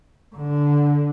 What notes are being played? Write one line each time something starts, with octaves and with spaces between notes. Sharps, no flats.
D3